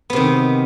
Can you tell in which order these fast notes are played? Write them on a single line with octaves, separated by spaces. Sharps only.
B3 C3 D#3